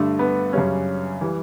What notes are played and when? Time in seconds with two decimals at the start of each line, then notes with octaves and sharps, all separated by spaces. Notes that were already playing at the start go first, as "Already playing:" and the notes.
Already playing: G2 D3 A3
0.19 B3
0.53 F#2 C#3 G3 C#4
1.21 E3 G3